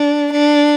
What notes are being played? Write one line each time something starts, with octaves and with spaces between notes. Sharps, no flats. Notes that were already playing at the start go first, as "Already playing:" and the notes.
Already playing: D4
D4